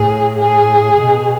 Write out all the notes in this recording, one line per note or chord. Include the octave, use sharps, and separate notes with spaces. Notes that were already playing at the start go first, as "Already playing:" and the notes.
Already playing: A2 G#4
G#4
B2